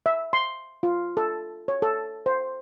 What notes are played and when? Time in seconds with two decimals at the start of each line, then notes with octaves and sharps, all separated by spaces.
0.06 E5
0.33 C6
0.83 F4
1.17 A4
1.68 C#5
1.82 A4
2.26 C5